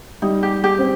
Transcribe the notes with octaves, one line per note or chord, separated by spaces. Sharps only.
G3 D#4
G4
G4
C4